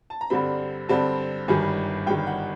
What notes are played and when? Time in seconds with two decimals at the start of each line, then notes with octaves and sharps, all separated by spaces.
0.10 A5
0.21 A#5
0.30 G2 D3 G3 C4 B5
0.89 G2 D3 G3 C4 A5
1.48 G1 G2 D#3 G3 G#5
2.06 G1 G2 D#3 G3 G5
2.27 F#5